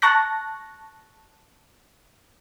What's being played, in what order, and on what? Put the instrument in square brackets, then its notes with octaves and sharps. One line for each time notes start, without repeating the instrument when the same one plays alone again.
[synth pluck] A5 C#6 F#6 A#6